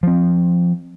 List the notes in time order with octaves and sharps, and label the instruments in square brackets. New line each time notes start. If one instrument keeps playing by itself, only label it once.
[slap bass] F3 C4